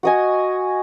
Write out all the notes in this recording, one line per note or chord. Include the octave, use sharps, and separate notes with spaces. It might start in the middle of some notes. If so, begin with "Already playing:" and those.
F#4 D#5 G#5